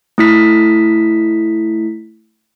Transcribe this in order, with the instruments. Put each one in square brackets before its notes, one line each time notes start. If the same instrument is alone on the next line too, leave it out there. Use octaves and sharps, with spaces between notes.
[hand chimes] A3 E4 B6